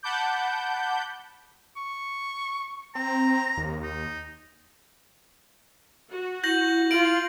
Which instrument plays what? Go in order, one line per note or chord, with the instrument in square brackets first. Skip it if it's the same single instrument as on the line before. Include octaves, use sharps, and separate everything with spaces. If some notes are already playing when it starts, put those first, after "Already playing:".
[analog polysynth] F#5 A5 B5 D6 G6
[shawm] C#6
[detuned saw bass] C4 [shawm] A#5
[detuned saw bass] D#2
[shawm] D#4
[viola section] F#4
[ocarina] E4 [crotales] G6 A#6 F#7
[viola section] F4 [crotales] D7 F#7